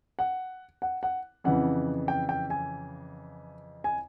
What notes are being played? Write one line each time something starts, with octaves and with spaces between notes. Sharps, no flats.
F#5
F#5
F#5
F2 C#3 E3 F#5
G5
G5
G#5
G#5